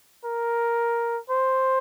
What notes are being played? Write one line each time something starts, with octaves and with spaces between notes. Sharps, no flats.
A#4
C5